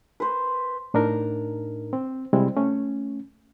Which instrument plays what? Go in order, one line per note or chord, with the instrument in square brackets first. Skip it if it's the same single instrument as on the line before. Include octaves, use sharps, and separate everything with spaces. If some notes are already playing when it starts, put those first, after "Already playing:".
[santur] B4 C5
[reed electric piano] A2 D4 D#4 A#4
C4
C3 G3 G#3 C4 E4
A3 C#4